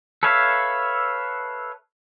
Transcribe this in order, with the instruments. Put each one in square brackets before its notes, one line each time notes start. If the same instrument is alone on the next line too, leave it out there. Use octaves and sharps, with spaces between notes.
[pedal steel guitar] A4 B4 C#5 E5 F5